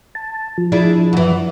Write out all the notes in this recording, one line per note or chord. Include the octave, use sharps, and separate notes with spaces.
A5
F3
D4 E4 G#4
F#2 E3